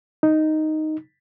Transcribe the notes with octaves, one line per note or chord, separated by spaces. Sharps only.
D#4